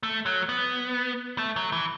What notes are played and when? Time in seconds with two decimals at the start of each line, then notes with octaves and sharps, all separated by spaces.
0.03 A3
0.26 F#3
0.49 B3
1.38 A3
1.56 F#3
1.72 E3